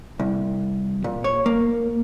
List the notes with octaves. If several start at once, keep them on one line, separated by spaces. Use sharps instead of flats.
C2
A#2
C#5
A#3